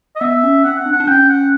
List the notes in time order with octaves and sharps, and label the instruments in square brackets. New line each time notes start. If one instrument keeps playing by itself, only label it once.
[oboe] D#5
[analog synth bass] B3 [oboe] E5
[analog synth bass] C#4
[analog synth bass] C4 [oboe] F#5
[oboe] F#5
[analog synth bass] D4
[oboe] F#5
[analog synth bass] D4
[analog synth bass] C#4 [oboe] G5
[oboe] F#5